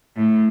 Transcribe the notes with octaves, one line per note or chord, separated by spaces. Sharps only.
A2